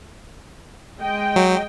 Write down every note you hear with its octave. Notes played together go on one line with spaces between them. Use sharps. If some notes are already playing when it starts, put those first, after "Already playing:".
G#3 D#5 G5
F#3